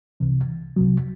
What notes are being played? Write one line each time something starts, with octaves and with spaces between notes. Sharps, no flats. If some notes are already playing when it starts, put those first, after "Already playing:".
C2 C3 E3
C2 C3 F#3